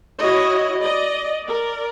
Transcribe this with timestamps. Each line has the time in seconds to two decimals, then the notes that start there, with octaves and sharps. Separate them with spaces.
0.21 E4 F#4 C#5 D#5
0.81 D5 D#5
1.44 A#4 D5